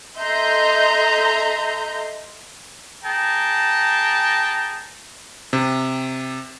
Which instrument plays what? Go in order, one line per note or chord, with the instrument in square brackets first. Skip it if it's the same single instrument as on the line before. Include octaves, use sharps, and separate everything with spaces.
[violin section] A4 D#5 E5 A#5 C6 G6
[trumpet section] G#4 G5 A5 A#5
[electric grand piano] C3